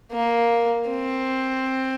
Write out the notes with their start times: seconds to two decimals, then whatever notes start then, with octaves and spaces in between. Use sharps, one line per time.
0.12 A#3
0.90 C4